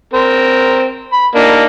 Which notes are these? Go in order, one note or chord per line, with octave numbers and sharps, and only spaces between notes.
C4 A#4
B5
A#3 D4 D#4